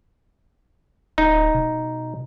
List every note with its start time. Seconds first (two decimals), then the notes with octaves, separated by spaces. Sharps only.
1.18 D1 D#4
1.55 B2